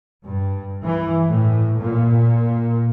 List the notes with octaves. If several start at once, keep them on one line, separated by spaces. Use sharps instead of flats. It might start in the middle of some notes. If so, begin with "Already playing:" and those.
G2
E3
A2
A#2